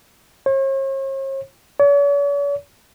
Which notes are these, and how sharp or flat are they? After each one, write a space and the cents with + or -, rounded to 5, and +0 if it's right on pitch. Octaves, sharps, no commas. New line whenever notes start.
C#5 -45
C#5 +45